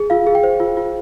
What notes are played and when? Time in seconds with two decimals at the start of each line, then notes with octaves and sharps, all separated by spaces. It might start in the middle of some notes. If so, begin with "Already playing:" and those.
Already playing: G#4
0.10 F4 F5
0.27 G#4
0.35 G5
0.44 C5
0.60 F4
0.77 F4